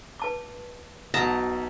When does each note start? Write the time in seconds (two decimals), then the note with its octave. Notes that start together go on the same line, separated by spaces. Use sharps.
0.20 B4 A5 D6
1.14 B1 B2 F#5 A5 A#5 D#6